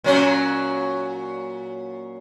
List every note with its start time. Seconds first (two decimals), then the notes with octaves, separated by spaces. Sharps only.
0.04 A#2 F#3 C#4